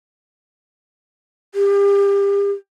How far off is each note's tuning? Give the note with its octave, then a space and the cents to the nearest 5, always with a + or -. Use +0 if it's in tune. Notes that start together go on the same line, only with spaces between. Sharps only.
G4 +35